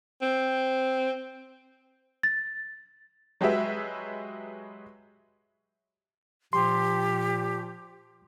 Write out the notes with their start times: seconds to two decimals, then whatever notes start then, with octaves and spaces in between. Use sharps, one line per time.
0.22 C4
2.23 A6
3.41 F#3 G#3 G4 G#4 B4 E5
6.53 A#2 F3 G4 C6